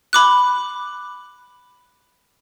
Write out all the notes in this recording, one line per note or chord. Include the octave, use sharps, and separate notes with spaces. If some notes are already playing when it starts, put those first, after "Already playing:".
B5 D6 F#6